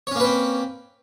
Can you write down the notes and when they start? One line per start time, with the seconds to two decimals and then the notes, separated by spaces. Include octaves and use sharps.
0.07 C#5
0.11 C#4
0.16 A#3
0.20 B4
0.24 C4